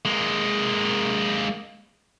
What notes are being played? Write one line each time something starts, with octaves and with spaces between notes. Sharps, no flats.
G#3 A#3